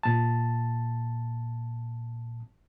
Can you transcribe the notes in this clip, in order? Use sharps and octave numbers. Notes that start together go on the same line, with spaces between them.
A#2 A5